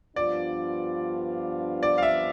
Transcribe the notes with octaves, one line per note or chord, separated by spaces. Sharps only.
G2 F3 B3 D4 F4 D5
D5
F5
E5